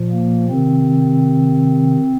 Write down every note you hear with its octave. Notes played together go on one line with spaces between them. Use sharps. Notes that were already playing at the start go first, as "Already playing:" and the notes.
Already playing: A#2 F3
A#3
C3 D#3 C4